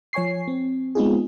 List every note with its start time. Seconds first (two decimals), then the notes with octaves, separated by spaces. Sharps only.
0.13 F3 C#5 G#5 C#6 C7
0.48 C4
0.95 G#3 B3 C4 D#4 F4 G#4